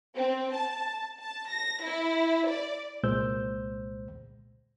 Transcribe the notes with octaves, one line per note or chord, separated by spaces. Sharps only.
C4
A5
A5
A#6
E4
D5
C2 A#2 G#3 C5 E6 G6